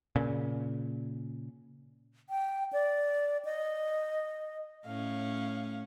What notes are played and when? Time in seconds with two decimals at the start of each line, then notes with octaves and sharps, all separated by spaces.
0.16 A#2 C#3
2.30 G5
2.73 D5
3.45 D#5
4.86 A2 C#4 F5